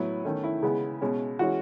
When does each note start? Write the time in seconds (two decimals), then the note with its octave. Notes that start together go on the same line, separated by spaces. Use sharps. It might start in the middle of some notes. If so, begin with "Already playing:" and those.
Already playing: A2 F#3 B3 E4
0.25 D#3 A3 C#4
0.44 E4
0.63 C#3 G#3 B3
1.01 B2 G#3 C#4
1.39 E3 G#3 C#4 F#4